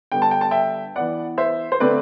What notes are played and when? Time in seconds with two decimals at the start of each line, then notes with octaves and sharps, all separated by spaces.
0.12 D3 G3 B3 G5
0.22 A5
0.31 G5
0.41 A5
0.51 E5 G5
0.96 E3 B3 D5 F#5
1.38 C5 E5
1.72 C5
1.80 D3 A3 C4 B4 D5